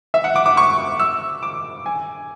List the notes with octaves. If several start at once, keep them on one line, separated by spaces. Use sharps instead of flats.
E5
F#5
D6
D6
C#6
E6
D6
G#5